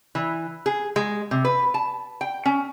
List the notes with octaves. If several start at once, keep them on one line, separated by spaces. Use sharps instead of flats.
E3
G#4
G#3
C3
B4
A5
G5
C#4